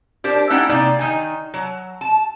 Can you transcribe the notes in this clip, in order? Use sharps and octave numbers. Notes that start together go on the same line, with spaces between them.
D4 G4 A#4 C5 D5
A3 C#4 D#4 E4 F#5 G5
C3 A#3 D#4 D5 G#5
D#3 D#4 G#5
F#3
A5